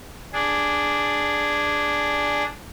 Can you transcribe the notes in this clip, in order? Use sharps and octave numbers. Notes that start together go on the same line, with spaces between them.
D4 G#4